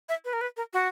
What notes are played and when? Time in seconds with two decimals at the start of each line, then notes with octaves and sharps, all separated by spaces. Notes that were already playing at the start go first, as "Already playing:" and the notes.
0.09 E5
0.25 B4
0.33 A#4
0.41 B4
0.57 A#4
0.73 F#4